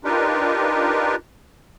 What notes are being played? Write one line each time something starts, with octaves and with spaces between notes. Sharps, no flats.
D4 D#4 F4 G4 A#4 B4